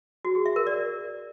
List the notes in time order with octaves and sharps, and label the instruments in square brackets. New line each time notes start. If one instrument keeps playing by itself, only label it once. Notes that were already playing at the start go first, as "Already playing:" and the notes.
[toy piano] F#4
G#4
E5
A#4
D5